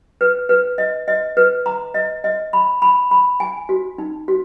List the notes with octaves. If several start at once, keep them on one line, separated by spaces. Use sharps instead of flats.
B4
B4
D#5
D#5
B4
A#5
D#5
D#5
B5
B5
B5
G#5
F#4
D#4
F#4